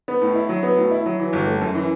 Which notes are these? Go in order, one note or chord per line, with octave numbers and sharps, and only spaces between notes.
B3
A2
E4
F#3
B3
A2
E4
F#3
E3
G1
A3
F#2
E3